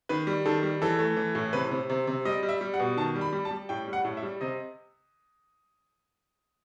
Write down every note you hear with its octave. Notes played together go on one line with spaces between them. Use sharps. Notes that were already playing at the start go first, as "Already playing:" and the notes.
D#3 B4
G3
D#3 A4
G3
E3 A4
A3
E3
A2
C3 B4
C3
C3
C3
G3 D#5
G3
E5
G3
F#5
B2
D#3 A5
G3
B5
G3
A5
G3
A2 G5
G3
F#5
A2
E5
G3
C3 D#5